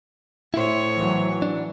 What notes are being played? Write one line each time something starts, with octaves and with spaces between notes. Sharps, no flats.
A2 E4 C5 C#5
E3 F#3
D4